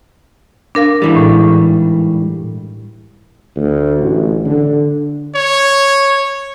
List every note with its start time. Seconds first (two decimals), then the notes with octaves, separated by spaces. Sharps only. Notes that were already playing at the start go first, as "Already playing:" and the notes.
0.75 D4 A#4 F5
1.02 G#2 E3 G3
1.16 A2
3.56 D2
4.01 A1
4.46 D3
5.35 C#5